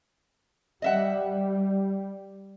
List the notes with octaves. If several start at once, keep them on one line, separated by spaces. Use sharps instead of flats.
G3 D#5 E5 F#5